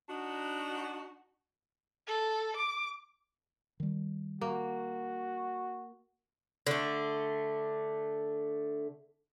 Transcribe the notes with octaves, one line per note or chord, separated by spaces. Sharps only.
D4 D#4 F#4
A4
D6
D#3 G3
A#3 F#4
D3 A3